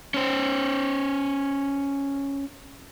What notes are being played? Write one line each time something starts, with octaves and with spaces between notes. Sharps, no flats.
C#4 C5